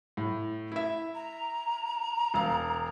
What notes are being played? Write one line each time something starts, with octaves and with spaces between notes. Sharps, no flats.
A2
E4 E5
A#5
E1 F5